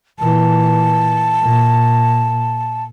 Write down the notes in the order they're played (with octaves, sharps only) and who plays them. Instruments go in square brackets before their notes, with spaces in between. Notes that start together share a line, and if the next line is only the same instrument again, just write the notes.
[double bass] A#2 E3 [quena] A5
[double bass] A#2